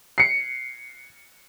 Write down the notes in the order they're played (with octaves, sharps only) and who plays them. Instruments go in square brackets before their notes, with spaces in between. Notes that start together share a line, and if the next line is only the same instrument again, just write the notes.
[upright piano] C7 C#7